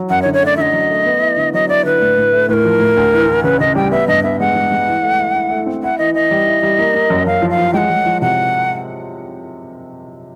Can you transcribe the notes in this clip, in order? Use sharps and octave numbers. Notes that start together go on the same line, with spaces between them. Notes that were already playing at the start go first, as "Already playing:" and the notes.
Already playing: F#3
F#2 F#5
C#5
D3
C#5
A3
D5
D3 D#5 E5
F#3
A3
B3
E4
D3
F#3 D#5
E4 D5
D3 B4
A2
A2
A3
A2 A#4 B4
F3
A2
D2
E3
E3
C#3 B4
C#3 D#5
G3 G5
B3 E5
G2 D#5
B3 E5
G#3 F#5
G#3
G#3
E3
A3
E4
E4
A3
C4
E4 F#5
E3 D#5
E3 D#5
G3
E4
G3
A#3
A#3
F#2
F#2 F5
F3
F5
F3
G#3 F#5 G5
G#3
F3
C3 F#5